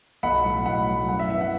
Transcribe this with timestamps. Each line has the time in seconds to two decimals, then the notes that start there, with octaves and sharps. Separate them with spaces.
0.23 B1 F#5 B5
0.44 A2 F#3
0.66 B1 F#5 B5
0.87 A2 F#3
1.09 F#2 F#5
1.19 E5
1.30 E3 B3 E4 E5
1.41 F#5